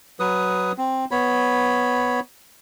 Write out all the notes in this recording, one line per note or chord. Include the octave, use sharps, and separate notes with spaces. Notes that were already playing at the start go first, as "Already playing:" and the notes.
F#3 B4 D#6
C4
B3 C#5 B5